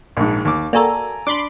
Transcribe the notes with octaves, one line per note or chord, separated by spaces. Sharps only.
A#1 G#2
D#2 D6
A#3 F#4 A4 D5 G#5 A#5
D4 B5 C6 D6